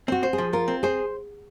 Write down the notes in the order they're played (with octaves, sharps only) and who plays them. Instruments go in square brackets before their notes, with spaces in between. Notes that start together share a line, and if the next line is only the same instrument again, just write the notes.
[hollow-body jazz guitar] C4 [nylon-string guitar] F#4
[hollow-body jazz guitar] C5
[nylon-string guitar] G#4
[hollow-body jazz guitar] F3
[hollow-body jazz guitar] F4 [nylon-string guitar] A#4
[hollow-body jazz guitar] C4
[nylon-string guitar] G#4 [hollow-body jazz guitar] C5